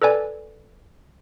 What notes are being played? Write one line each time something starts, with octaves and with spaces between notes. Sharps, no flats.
A4 B4 D5 G#5